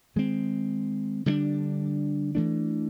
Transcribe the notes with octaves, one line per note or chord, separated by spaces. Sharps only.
D#3 G#3 C4
D3 G3 B3 D4
E3 A3 D4